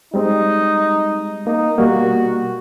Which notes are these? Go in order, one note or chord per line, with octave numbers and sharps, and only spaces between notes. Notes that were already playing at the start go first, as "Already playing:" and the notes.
G3 G#3 C4 D#4
A#3 D#4
B2 G3 A#3 F#4